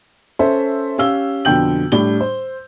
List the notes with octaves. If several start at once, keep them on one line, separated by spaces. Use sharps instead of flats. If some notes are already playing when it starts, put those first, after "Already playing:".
C#4 A4 C5 E5
C#4 G4 F5 E6 G7
F2 B2 D3 G5 G6 F#7
A2 G3 D4 G7
C5